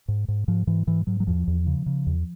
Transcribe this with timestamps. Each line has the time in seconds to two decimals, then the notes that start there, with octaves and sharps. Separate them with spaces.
0.08 G#2
0.28 G#2
0.48 G#2 F3
0.67 G#2 E3
0.87 G#2 E3
1.07 G#2 F#3
1.20 F#3
1.27 E2 F3
1.48 E2
1.67 C#3
1.86 C#3
2.07 E2